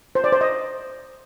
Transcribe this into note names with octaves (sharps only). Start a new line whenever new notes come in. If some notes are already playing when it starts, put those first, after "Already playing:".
C5
D5
C5
D#5